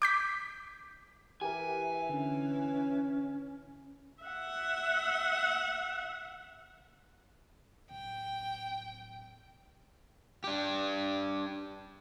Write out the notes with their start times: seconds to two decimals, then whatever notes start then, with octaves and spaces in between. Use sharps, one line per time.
0.02 D6 G6 B6
1.41 E3 G4 A#4 E5 G#5
2.09 D3 C#4
4.23 E5 F#5
7.91 D1 G5
10.44 D4 G4